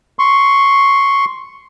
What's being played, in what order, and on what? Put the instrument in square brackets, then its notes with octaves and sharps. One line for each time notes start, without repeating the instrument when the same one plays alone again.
[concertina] C6 C#6